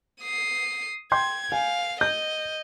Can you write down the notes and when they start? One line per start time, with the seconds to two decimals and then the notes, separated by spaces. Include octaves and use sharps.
0.21 D#6 C7
1.12 G5 C6 G6 G#6
1.52 F5 G#5
2.01 D#5 G6